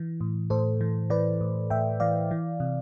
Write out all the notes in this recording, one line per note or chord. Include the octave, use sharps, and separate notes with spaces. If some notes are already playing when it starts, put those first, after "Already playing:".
Already playing: E3
A2
A2 A4 C5
E3
E3 B4 D5
A2
A2 E5 G5
E3 D5 F5
E3
C3